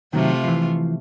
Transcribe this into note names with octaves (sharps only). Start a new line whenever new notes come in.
C3 D#3 F#3 A3 F4
E3 F3